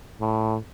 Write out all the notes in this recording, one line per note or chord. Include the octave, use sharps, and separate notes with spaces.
A2